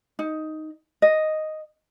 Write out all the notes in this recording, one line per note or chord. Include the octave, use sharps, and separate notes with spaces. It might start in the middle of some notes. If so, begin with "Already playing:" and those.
D#4
D#5